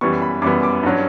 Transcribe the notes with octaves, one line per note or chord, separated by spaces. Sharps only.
F#2 E3 G3 B3 C#6
B5
F#2 E3 G3 B3 D6
D6
G2 F#3 C#4